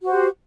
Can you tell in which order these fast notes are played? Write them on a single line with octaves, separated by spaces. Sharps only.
F#4 C5 G4